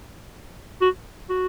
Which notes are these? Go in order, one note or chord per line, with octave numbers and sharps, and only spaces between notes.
F#4
F#4